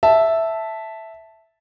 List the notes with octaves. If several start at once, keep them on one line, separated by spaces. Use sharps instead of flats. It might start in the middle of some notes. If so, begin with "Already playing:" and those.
E5 A5